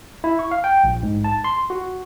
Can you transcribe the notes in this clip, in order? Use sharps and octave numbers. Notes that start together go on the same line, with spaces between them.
E4
C#6
F5
G5
A#1
G#2
A5
C6
F#4